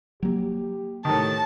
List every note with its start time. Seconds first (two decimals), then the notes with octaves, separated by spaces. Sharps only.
0.23 F#3 A#3 G4
1.05 A2 D#3 A5